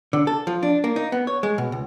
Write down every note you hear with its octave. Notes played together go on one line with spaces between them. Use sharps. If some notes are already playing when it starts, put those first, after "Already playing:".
D3
A4
F3
D4
A#3
D#4
B3
C#5
G#3
B2
C#2